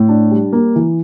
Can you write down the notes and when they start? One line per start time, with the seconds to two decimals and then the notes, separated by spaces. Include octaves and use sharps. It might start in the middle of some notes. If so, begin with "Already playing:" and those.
Already playing: A2
0.09 D4
0.31 G3
0.53 A#3
0.75 E3